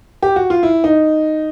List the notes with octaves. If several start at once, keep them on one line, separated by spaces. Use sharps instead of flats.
G4
F#4
F4
E4
D#4